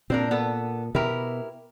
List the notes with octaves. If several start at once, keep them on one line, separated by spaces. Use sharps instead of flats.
A#2 C4 D4 A#4
B3 A4
B2 E4 G4 A#4